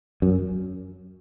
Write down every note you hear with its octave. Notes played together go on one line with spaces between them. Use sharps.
F#2